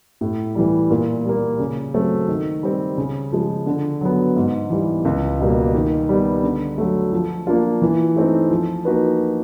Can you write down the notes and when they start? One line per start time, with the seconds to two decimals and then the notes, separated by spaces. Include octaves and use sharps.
0.21 A2
0.55 E3 G3
0.90 A#2
1.25 G3 A#3
1.59 C#3
1.94 F#3 A3 C4
2.28 D#3
2.63 G3 C4
2.97 C#3
3.32 F3 G#3
3.66 D3
4.01 F#3 B3
4.36 G#2
4.70 E3 G3
5.05 C#2
5.40 B2 G3 A#3
5.74 D#3
6.09 G3 B3
6.43 D3
6.78 F#3 A3
7.12 F3
7.47 A#3 D4 F4
7.82 E3
8.16 A3 C4 D#4
8.51 F3
8.85 A#3 D#4 F#4 B4